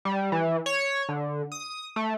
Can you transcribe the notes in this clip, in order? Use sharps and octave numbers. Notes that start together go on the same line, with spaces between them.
G3
E3
C#5
D3
D#6
A3